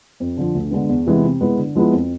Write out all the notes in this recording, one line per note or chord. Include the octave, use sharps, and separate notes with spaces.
F2
D3 F3
D2
D3 G#3 B3
E2
C3 E3 G#3 B3
C3
G#3 B3 E4 B4
D3
F3 G#3 B3 E4
F2